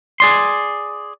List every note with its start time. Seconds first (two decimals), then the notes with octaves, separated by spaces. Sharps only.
0.20 G#4 D5 C6